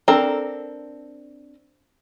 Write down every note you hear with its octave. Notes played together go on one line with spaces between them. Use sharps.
C4 D4 A4 A#4 A#5